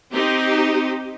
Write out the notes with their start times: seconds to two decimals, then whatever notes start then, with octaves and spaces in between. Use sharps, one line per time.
0.11 C4 D#4 G4